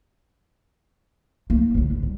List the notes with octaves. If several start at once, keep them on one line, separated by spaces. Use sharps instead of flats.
A3 A#3
A1 D3
D3
G3